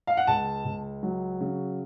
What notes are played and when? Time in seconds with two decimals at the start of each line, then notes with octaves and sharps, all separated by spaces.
0.07 F5
0.17 F#5
0.27 C#2 A5
0.65 C#2
1.03 F#3
1.41 C#3